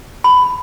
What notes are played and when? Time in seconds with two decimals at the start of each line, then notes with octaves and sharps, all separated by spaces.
0.24 B5